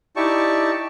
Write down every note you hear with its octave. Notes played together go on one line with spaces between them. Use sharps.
D#4 E4 G4 D5 A5 C#6